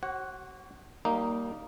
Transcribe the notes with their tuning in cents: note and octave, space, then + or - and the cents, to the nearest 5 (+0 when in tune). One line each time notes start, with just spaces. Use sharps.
F#4 +35 C#5 -45 F#5 +0
G3 -25 A#3 -5 D#4 +0